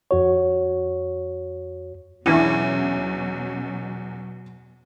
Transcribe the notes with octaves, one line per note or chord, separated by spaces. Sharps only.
F2 F#4 C#5
E2 B2 E3 F#3 C#4 D4 E4